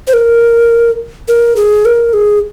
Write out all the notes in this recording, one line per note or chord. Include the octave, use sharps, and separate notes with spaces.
C5
A#4
A#4
G#4
A#4
G#4